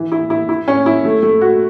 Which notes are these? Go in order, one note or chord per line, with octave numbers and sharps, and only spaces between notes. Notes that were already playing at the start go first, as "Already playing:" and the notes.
Already playing: E3
E4
E4
E4
C#4
E4
A3
A3
F#4